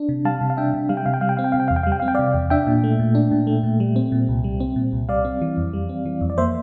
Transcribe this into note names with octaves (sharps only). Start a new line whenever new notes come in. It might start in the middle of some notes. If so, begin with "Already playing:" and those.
Already playing: D4
C3
G3 F5 A5
C3
F5
D4 E5 G5
C3
G3 F5
G5
C3 F5
G5
G3 F5
G5
C4 F5
G5
C3 F5
G5
E2 F5
G5
F5
G3
G5
C4 F5
G5
C3 D5 F5
E2
D4 E5 G5
A#2
A3
A#2
D4
A#2
A3
A#2
G3
C4
A#2
C2
G3
C4
A#2
C2
G3 D5 F5
C4
E3
F2
G3
C4
E3
F2
D5
A#3 C5 E5